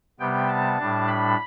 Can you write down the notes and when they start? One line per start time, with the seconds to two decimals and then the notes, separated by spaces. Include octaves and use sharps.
0.19 C3 G3 B3 G5
0.48 A5
0.78 A2 G3 D4
1.07 B5